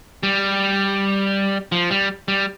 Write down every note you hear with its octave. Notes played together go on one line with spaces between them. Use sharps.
G3
F3
G3
G3